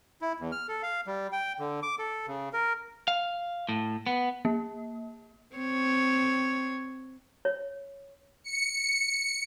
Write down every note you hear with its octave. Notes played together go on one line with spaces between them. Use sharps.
E4
E2
F6
A4
F5
G3
G5
D3
D6
A4
C#3
A#4
F5
A2
B3
A#3
C4 C#5
C#5
C#7